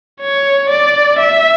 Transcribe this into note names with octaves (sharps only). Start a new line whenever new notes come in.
C#5
D5
E5